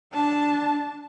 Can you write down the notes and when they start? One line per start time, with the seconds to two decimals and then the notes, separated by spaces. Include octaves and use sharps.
0.12 D4 A5